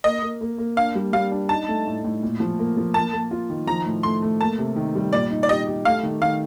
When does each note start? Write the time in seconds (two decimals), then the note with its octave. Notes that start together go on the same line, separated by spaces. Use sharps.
0.04 A#3 D#5
0.22 A#3
0.41 A#3
0.58 A#3
0.76 D4 F5
0.95 G3
1.13 G3 F5
1.31 D4
1.49 D#4 A5
1.68 A3
1.87 A2
2.04 A2
2.23 A#2
2.40 F3
2.59 A#3
2.77 F3
2.94 A#3 A5
3.13 A#3
3.31 F4
3.50 D#3
3.67 F3 A#5
3.85 A2
4.03 A3 C6
4.22 A3
4.41 A#3 A5
4.58 C3
4.76 D#3
4.95 G3
5.13 A#2 D5
5.30 D#4
5.43 D5
5.49 G4 D#5
5.67 G4
5.85 A3 F5
6.03 D#3
6.21 D#3 F5